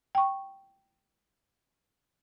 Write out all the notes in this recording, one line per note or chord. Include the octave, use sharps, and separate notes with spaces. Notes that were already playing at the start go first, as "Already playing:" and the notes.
G5 C#6